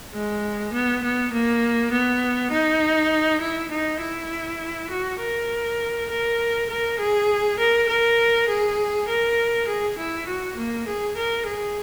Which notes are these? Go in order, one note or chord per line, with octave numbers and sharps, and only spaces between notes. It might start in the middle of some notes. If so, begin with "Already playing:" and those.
G#3
B3
B3
A#3
B3
D#4
E4
D#4
E4
F#4
A#4
A#4
A#4
G#4
A#4
A#4
G#4
A#4
G#4
E4
F#4
A#3
G#4
A#4
G#4